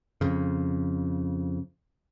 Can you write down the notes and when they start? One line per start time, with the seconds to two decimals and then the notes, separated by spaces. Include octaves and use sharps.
0.21 F2 C#3